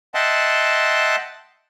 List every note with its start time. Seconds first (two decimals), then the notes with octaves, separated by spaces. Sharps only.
0.15 D#5 E5 F#5 G5 A5 C6